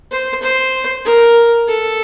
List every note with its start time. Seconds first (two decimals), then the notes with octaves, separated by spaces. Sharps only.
0.11 C5
0.43 C5
1.05 A#4
1.68 A4